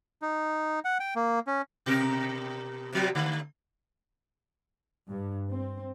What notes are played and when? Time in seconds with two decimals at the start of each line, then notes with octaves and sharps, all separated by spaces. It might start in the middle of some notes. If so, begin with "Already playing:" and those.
0.22 D#4
0.85 F#5
1.00 G5
1.16 A#3
1.47 C#4
1.86 B2 G4 A#4
2.92 C3 F3 F#3
3.15 D3 A3
5.09 G2
5.50 C4